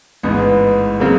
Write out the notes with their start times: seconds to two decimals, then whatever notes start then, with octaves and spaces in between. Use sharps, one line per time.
0.23 A1 G#2 E3 B3
1.00 C#3 F#3 A#3 C4